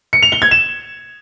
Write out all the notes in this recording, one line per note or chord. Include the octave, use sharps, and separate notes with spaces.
C#7
F7
G7
G#6
E7